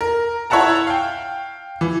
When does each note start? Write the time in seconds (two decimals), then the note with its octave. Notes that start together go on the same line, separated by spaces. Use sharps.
0.01 A#4
0.50 E4 C#5 E5 F#5 A5 A#5
0.87 F5 G5
1.81 E3